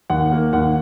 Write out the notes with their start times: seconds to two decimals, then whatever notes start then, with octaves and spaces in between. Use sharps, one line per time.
0.10 D#2 F#5
0.32 A#3
0.53 D#2 F#5